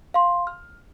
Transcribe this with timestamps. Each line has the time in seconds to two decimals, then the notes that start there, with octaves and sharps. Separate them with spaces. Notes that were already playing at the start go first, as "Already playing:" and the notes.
0.14 F5 C6
0.47 F6